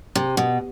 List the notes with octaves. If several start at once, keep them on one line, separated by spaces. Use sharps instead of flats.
C3
B2